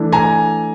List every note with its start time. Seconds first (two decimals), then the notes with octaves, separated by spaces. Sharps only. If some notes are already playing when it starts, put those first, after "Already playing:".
Already playing: E3 A3 D4
0.12 G#5 A#5